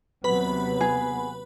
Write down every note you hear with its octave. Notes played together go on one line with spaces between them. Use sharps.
D#2 C3 F#3 B3 B4 B5
G#4